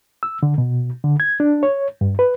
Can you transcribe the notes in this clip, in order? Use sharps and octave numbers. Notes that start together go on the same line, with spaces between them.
E6
D3
B2
D3
G#6
D4
C#5
G2
B4